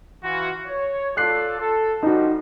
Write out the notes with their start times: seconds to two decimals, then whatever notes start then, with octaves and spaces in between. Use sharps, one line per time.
0.24 E3 F4 F#4
0.67 C#5
1.17 F4 A4 D5 F#6 C7
1.60 A4
2.03 F3 G3 D#4 F#4